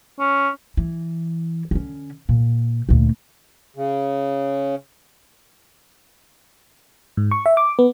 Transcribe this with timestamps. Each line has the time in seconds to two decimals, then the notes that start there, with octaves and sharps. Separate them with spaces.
0.20 C#4
0.77 E3
1.71 D3 C#4
2.29 A#2
2.89 D2 A#2
3.76 C#3
7.17 G#2
7.31 C#6
7.46 E5
7.57 D6
7.79 B3